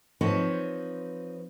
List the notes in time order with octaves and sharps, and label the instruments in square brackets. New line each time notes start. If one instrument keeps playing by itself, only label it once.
[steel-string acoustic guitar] F3 C4 D#4 B4 C#5